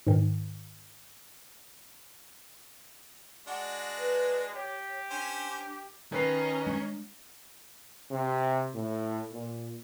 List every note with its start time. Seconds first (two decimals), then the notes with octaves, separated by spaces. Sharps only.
0.07 G#2 D#3
3.47 G#3 D4 F#4 F#5
3.97 B4
4.54 G4 C#5
5.10 C#4 D4 C5
6.12 D#3 C#4 B4 D#5 A#5 C7
6.67 G#3 D4
8.11 C3
8.74 A2
9.32 A#2